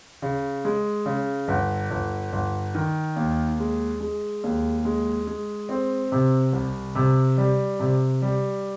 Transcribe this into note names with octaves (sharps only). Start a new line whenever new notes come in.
C#3
G#3
C#3
G1
G1
G1
D#3
D#2
G#3
G#3
D#2
G#3
G#3
C4
C3
C2
C3
G3
C3
G3